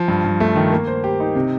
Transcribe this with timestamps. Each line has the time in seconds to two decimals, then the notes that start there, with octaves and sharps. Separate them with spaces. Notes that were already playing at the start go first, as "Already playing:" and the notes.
Already playing: F3
0.08 G2
0.24 G2
0.40 A3
0.56 D#3
0.72 A#3
0.87 C5
1.04 G4
1.20 D#4
1.35 C3